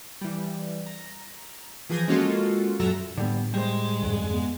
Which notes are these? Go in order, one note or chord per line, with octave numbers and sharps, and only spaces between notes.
E3 G3
A#5
E3 F3 G#4 G#5 G6 A#6
G#3 A#3 C#4 F4 F#4 A4
F#2 A#2 F#3 A4 E5 A#5
A2 D3 G3 B3
G3 G#3 C5
F2 G#2 D3
B3